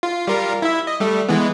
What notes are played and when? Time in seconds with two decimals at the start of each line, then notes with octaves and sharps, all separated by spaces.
0.03 F4
0.27 G3 F4 A#4
0.62 E4 E5
0.87 D#5
1.00 G3 A3
1.28 E3 G#3 B3